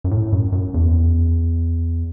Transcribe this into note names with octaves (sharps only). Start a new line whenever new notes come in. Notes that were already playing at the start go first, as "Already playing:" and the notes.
F#2
A2
F#2
F#2
E2